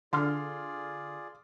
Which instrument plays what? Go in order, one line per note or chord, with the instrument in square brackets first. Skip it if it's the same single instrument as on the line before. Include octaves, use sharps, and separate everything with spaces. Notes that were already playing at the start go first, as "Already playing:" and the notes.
[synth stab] D3 [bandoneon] F4 G#4 D5 [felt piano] C6 F6